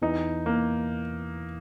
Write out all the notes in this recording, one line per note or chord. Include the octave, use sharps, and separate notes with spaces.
E2 E3 D#4
A#3